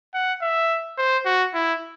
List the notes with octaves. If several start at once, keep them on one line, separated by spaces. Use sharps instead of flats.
F#5
E5
C5
F#4
E4